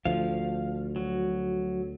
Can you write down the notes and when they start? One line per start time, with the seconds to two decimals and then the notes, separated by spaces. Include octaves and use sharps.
0.05 D2 F3 F5
0.96 F#3